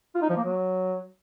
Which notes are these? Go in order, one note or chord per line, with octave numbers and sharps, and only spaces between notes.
F4
D#4
F3
A#3
F#3